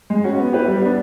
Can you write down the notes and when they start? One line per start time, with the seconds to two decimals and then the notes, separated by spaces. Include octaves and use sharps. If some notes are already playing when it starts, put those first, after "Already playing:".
0.10 G#3
0.24 C#4 F#4
0.40 B3
0.53 E4 G4 B4
0.68 G3
0.81 B3 D4